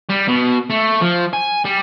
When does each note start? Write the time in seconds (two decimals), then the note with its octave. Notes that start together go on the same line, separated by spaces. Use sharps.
0.09 G3
0.28 B2
0.70 A3
1.01 F3
1.34 G#5
1.65 G3